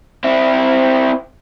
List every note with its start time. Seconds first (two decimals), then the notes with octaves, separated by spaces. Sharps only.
0.24 C4 E4